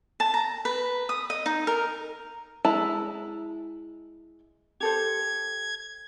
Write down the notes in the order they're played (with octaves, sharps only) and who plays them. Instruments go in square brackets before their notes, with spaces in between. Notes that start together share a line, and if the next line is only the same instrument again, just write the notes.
[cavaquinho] A5
A#5
B4
D#6
D#5
D#4
A#4
[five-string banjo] G#3 E4 A5 A#5
[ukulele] G4 A4 C5 [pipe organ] G#6